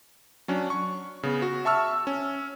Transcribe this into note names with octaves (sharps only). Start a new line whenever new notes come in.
F#3 C#4 D4
C#6
C#3 B3
F#4
E5 A5 C#6 E6 F6
C#4